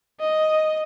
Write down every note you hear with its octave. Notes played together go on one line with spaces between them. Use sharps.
D#5